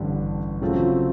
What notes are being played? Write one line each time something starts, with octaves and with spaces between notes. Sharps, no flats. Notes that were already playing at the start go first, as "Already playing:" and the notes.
Already playing: A1 G2 D3 G3
C#3 F#3 A3 C4 F4